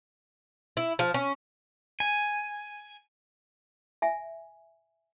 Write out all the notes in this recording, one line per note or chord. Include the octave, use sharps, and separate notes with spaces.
E4
F3
C#4
G#5
E5 G#5